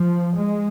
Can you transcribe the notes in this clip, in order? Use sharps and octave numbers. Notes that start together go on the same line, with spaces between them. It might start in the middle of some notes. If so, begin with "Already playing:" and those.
Already playing: F3
G#3